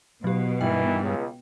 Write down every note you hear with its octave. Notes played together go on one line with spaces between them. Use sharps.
B2 F#3 G4
G2 D#3 E3 G5
C#2